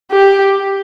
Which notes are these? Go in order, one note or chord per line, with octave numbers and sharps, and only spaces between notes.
G4